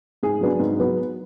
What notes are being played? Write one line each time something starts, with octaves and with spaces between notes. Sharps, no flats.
G#2 G#4
F#3 B3 D4
G#2
F#3 B3